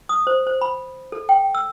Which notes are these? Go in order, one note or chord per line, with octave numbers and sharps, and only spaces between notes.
D#6
C5
C5
B5
A4
G5
E6